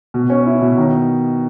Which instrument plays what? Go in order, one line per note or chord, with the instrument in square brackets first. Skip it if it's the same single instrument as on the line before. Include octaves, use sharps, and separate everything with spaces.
[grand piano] B2
C#4
E4
B2
D#3